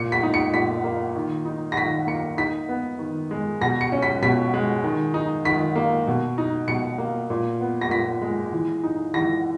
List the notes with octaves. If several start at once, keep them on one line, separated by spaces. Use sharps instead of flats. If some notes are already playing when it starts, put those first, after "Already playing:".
Already playing: A#2 C#7
B6
D#4
C#7
A#2 B6
A#3
D#3
D#4
A#6
D#3 B6
A#3 C#7
D#4 B6
B3
D#3
G#3
B2 A#6
C#7
C#4
B6
B2 B6
G#3
D#3
D#4
D#3 B6
A#3
B2
D#4
B2 C#7
A#3
A#2
B3
A#6
A#2 B6
G#3
E3
D#4
E3 A#6